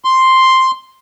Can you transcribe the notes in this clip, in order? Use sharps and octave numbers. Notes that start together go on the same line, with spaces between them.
C6